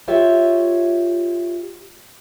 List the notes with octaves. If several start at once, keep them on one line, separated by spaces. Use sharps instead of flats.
F4 G4 C#5 E5